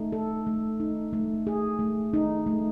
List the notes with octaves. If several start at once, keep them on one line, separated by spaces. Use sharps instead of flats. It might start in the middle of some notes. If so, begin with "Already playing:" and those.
Already playing: A3 D#4
A4
A3
D#4
A3
G#4
A3
D#4
A3